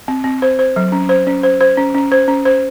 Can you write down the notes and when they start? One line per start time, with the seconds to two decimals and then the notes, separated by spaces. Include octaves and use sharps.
0.08 C4
0.24 C4
0.42 C5
0.59 C5
0.76 F#3
0.92 C#4
1.09 C5
1.27 C#4
1.43 C5
1.61 C5
1.77 C#4
1.95 C#4
2.12 C5
2.28 C#4
2.45 C5